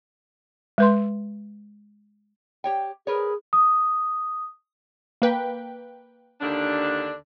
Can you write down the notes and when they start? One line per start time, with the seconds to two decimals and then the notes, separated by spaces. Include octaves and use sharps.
0.78 G#3 B4 C6
2.64 G4 C#5 G5
3.07 G#4 A#4 B4 C#5
3.53 D#6
5.22 A#3 B4 G5
6.41 D#2 D3 D4